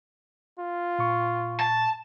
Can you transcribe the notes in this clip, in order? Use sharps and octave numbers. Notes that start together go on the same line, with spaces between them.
F4
A#2 C#6
A5